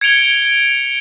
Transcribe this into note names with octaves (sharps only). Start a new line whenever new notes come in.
G#6 C#7 D7 F7 G7